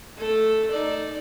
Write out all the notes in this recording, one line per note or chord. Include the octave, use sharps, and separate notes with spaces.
A3 A4
D#4 D5